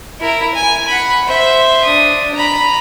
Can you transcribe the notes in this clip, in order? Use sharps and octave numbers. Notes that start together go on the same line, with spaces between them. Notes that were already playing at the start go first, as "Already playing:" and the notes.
E4 A#4
G#5
F#5 B5
C5 E5
D4 D#6
A#5 B5